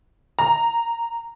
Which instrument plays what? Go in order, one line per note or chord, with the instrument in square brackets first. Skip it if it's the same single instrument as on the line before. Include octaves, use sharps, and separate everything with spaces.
[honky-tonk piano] A#5